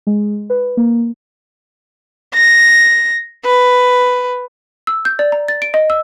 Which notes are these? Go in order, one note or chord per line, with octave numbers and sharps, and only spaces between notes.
G#3
B4
A#3
A#6
B4
E6
G6
D5
A#5
A6
D7
D#5
E6